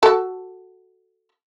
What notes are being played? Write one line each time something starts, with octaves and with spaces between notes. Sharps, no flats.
F#4 A4 A5